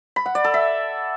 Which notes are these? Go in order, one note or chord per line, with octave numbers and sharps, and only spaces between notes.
B5
F#5
D5
A4
E5